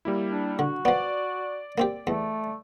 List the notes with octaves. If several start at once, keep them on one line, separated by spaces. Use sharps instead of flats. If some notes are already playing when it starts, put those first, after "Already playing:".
G3 A#3 E4
D4
D3 F#4
F3 B3 D5
A#3 C4 G4
E2 A3